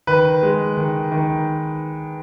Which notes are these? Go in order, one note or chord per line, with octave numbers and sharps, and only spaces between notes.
D#3 B4
G#3
D#3
D#3